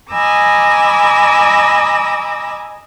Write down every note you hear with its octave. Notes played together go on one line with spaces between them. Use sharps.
D#5 G#5 A#5 B5 D6 E6